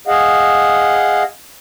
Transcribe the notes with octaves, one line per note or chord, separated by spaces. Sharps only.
G#4 D#5 F5 F#5